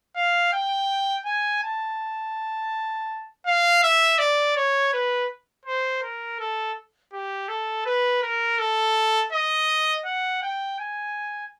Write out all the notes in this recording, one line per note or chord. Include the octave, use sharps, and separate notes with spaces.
F5
G5
G#5
A5
F5
E5
D5
C#5
B4
C5
A#4
A4
G4
A4
B4
A#4
A4
D#5
F#5
G5
G#5